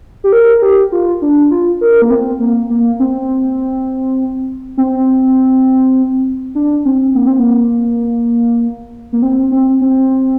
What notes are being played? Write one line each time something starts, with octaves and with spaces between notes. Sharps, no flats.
G4
A#4
A#4
G4
F4
D4
F4
A#4
A#3
C4
A#3
A#3
C4
C4
D4
C4
A#3
C4
A#3
A#3
C4
C4
C4